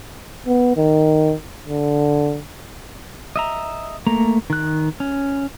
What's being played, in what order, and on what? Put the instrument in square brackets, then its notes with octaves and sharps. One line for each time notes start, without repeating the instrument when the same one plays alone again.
[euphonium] B3
D#3
D3
[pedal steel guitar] D#5 E5 A#5
A3 A#3 A#5
D#3 F#6
C#4